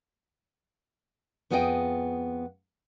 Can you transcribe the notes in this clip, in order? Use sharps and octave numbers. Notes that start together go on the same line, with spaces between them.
F2 B3 F4 G#4 D#5 G5